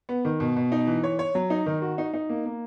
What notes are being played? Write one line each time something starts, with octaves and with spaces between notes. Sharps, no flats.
B3
D#3
B2
B2
D#4
E3
C#5
C#5
F#3
D#4
D#3
F#4
D#4
D#4
A#3
A#3